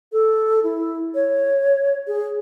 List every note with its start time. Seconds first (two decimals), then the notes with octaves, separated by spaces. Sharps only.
0.12 A4
0.64 E4
1.15 C#5
2.07 G#4